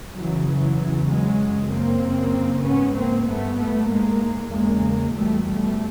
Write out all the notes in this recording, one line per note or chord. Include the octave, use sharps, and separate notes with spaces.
F#2 C#3 E3 F#3
E3 F#3
E2 C#3
F#3 G#3
F#2 C#3
A#3 C4
F#2 C#3
G#2 B3 C#4
A#3 C4
G2 A3 B3
A3 B3
G#2 G#3 A#3
E2 C#3 G#3 A#3
E2 B2 G3 A3
G3 A3